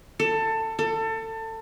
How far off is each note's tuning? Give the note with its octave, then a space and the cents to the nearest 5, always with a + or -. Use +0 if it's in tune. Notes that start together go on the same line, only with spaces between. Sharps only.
A4 +20
A4 +25